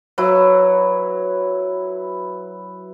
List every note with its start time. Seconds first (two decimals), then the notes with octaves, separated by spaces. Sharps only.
0.18 F#3 E4 B4